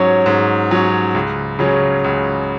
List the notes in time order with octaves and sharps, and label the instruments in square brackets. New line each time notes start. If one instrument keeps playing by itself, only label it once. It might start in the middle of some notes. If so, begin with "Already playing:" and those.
Already playing: [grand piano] G#2 F#3 C#4
G#2
F#3 C#4
C#2
C#3 F#3 C#4
C#2